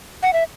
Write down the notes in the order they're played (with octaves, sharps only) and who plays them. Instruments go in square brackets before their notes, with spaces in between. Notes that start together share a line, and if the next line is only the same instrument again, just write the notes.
[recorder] F#5
E5